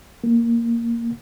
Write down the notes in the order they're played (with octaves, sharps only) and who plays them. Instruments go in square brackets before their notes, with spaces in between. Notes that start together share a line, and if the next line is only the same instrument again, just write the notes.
[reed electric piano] A#3